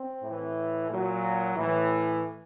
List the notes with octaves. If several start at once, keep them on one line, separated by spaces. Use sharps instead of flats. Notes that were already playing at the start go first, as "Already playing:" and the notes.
Already playing: C4
A2 E3
A#2 F#3
A2 E3